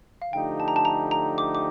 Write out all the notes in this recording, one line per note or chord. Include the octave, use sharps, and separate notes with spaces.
F5
D3 F3 A3 D#4 G4 G5
A5
A#5
A5
A#5
A#5
D6
D6